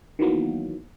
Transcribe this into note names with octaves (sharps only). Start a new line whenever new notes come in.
D#3 E3 F#3 A#3 B3